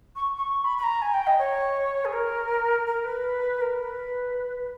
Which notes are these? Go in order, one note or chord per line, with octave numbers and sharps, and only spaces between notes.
C#6
C#6
B5
B5
A#5
G#5
G5
D#5
C#5
G#4
A#4
A#4
B4
A#4
B4